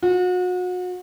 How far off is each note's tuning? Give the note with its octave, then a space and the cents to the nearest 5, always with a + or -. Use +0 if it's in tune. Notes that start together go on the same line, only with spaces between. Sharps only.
F#4 -35